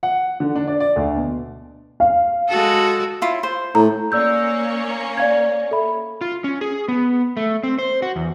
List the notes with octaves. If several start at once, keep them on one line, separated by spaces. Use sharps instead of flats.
F#5
D3
D4
D5
D5
D2
B2
F5
G#3 F#4 A4
E4 F4 C#5
C5
A2 A#5
A#3 C#4 C#5 D5 E6 G6
D5 F5 G#6
A4 E5 B5
F4
C#4
G#4
B3
A3
C4
C5
F#4
E2